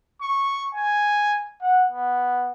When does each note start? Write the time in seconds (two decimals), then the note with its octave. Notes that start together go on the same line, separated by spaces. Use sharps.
0.21 C#6
0.74 G#5
1.61 F#5
1.91 B3